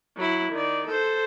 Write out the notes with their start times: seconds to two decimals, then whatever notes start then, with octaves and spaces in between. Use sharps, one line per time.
0.17 F#3 E4
0.52 D#3 D5
0.86 A4 C5